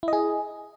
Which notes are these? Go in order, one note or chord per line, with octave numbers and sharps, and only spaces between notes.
E4 G#4 D#5